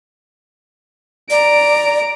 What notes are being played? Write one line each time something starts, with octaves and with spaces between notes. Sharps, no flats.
D5 A#5 D7